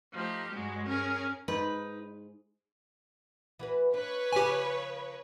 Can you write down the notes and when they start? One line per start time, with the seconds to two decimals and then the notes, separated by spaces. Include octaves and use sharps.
0.13 F3 A3 D#4 G4
0.52 G2 F#3 G#3
0.87 C#4 G#4 A#4
1.48 G#2 D#4 B4
3.59 E3 F#4 B4
3.94 D4 B4 C#5
4.33 C#3 F3 G4 G#5